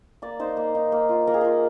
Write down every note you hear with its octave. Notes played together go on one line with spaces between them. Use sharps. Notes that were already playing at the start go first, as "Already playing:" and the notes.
A#3 D5
D#4 C5
A#3
D#4
A#3
F4
A#3 A#4
G#4
F4 A#4